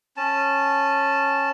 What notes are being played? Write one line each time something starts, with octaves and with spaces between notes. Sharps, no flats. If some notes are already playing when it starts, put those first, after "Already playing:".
C#4 A5